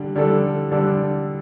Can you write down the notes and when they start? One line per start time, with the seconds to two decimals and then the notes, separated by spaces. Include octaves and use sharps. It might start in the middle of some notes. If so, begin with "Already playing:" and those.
Already playing: D3 G3 D4
0.16 D3 G3 D4 A4
0.72 D3 G3 D4 A4